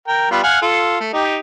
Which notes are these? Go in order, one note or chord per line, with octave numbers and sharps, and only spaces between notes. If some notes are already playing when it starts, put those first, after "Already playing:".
A#4 G5
G3 B3 F4
F5 F#5 G#5
F4 A4
A3
D#4 G4